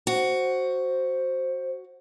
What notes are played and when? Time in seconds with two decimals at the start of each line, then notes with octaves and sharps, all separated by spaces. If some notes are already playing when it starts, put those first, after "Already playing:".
0.07 F#4 C5